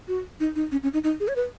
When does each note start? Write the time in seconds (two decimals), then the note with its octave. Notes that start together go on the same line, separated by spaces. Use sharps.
0.08 F#4
0.40 D#4
0.56 D#4
0.72 C#4
0.83 C#4
0.93 D#4
1.04 D#4
1.20 G#4
1.28 C#5
1.36 B4